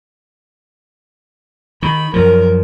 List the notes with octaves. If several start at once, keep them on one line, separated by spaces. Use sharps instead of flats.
D#3 B5
F#2 F3 A#4